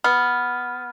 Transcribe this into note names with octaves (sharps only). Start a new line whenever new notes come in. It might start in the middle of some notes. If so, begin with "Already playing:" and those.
B3 F6